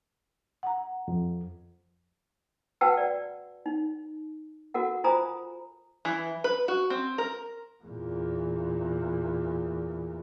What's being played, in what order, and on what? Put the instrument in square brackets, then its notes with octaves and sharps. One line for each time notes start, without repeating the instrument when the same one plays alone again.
[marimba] F#5 A#5
[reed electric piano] F2
[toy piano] F#4 B4 F#5 G5 A5 E6
D5
D#4
F#4 A4 A#4 F#5
F4 C5 G#5 A#5 B5 D#6
[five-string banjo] E3
B4
F#4
C4
A#4
[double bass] E2 A#2